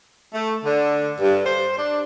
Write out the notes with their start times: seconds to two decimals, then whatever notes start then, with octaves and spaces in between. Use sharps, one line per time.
0.34 A3
0.64 D3
1.21 G2
1.45 C5
1.78 D4